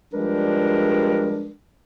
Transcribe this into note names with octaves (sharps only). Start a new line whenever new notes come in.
F3 G3 G#3 D4 A#4 B4